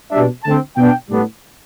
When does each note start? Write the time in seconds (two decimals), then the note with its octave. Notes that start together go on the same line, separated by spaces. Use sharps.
0.11 B2 G3 D4 E5
0.44 D3 A3 C4 A5
0.77 B2 B3 D4 G5
1.10 A2 G3 B3 D4